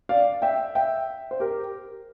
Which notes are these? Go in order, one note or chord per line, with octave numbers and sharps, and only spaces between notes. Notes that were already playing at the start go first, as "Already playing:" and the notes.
D5 F5
E5 G5
E5 G5
C5
G4 A#4